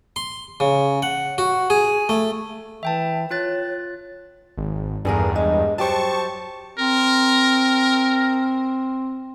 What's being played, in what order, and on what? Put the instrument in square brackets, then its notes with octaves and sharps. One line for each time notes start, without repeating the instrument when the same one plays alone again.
[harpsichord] C6
C#3
F#5
F#4
G#4
A3
[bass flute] E3 [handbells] E5 G5 A5
[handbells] F4 F#6 A6 [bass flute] C#5
[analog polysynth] G#1
[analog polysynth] E2 G2 [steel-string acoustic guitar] D3 G#4 A#4
[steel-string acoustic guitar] G#3
[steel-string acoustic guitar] F#3 G4 C5 [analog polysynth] A5 C#6
[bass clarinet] C4 [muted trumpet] A#4